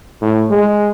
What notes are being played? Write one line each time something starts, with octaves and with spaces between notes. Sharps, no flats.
A2
G#3